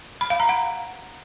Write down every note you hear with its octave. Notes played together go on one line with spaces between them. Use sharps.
B5
F5
A#5
F#5